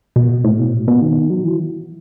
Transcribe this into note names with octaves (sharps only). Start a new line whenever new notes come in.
B2
A2
B2
A2
B2
D#3
F#3
E3